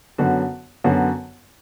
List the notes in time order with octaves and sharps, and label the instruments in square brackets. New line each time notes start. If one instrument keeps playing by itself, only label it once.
[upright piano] F#2 D3 F#3 B3 F#4
F#2 D3 F#3 B3 F#4